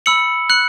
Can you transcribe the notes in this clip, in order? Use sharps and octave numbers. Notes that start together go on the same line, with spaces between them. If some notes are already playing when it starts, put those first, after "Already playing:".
B5 E6 C#7 F#7
F#6 C#7 F#7